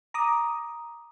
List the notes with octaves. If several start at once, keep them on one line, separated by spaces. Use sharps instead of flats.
A#5 D6 D#6